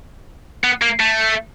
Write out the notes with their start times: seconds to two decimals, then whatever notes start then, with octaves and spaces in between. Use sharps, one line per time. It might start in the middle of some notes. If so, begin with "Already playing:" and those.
0.64 B3
0.82 A#3
1.00 A3